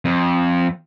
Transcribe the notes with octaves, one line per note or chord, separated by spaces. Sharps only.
F2